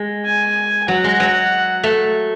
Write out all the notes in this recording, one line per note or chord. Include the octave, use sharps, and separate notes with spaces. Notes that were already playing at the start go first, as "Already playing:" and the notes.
Already playing: G#3
G#5
F#3 F#5
G#3
F#3
A3